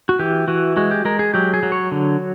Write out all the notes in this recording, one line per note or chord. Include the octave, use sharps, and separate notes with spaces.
F#4
E3 G4
E3 F#4
G#3 F#4
G4
G#3 A#4
G#4
F#3 G4
G#4
F#3
C#5
D3